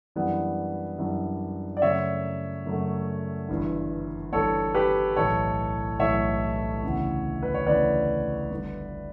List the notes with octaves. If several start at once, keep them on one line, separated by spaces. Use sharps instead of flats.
F#2 E3 G3 B3 D4
F#2 E3 G3 B3 D4
D5
F#2 C#3 F#3 A3 C#5 E5
F#2 C#3 F#3 A3
G1 G2 E3
G1 G2 E3 A4 C#5
G4 B4
B1 A2 E3 A3 A4 C#5
B1 A2 E3 A3 C#5 E5
D2 C#3 E3 B3
B4
C#5
D2 C#3 E3 B3 B4 D5
G1 G2 D3